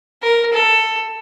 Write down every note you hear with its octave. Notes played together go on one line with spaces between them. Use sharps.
A#4
A4